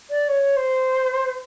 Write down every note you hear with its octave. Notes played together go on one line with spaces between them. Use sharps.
D5
C#5
C5